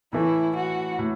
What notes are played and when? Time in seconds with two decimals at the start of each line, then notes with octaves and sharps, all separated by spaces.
0.13 A2 E3 A3 E4
0.56 F#4
0.99 A2